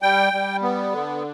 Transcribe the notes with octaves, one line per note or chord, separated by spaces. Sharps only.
G3 G5
G3
B3
D3